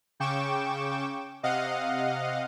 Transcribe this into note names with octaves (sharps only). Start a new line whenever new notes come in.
C#3 G5 C#6 D6 E7
C3 D#5 F5 F#5